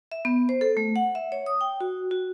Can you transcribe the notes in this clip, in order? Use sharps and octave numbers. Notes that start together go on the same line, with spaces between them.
E5
B3
C5
A4
A3
F#5
E5
C#5
D#6
G5
F#4
F#4